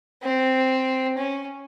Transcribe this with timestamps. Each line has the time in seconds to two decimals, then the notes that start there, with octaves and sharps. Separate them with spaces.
0.23 C4
1.17 C#4